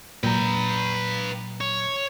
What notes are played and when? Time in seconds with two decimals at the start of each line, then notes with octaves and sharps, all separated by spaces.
0.23 A#2 F#3 B4 G5 A#5
1.61 C#5